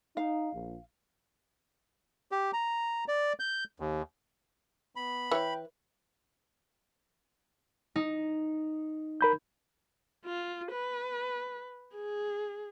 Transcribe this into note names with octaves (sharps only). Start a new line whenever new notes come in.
D#4 F5
A#1
G4
A#5
D5
G6
D#2
B3 B5
E3 B4 C#5 G5
D#4
A#4 B5 G6
F4
B4
G#4